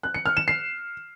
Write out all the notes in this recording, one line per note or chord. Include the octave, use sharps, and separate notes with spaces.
F#6
C#7
F6
E7
C7